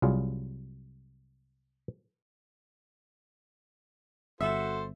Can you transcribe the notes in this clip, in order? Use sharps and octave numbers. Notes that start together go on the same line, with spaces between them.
C2 F#3 F4 G#4 D5
G1 F#4 A4 C5 E5